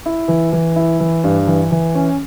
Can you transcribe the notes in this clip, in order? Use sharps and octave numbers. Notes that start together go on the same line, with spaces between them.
E4
E3
E3
E4
E3
G2
E3
E3
C#4